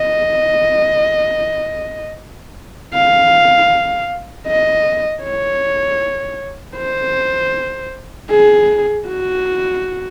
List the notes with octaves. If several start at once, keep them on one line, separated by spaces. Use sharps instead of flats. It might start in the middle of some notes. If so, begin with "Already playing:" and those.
Already playing: D#5
F5
D#5
C#5
C5
G#4
F#4